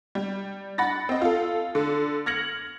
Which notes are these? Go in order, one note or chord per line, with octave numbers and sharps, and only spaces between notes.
G3
F#5 B5 A6 A#6
C4 D#5
F4 A4
D3
F6 G#6 A#6 C#7 F#7